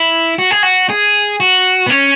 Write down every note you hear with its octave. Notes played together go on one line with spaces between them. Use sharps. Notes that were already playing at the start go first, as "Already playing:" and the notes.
Already playing: E4
F#4
G#4
F#4
G#4
F#4
B3
C#4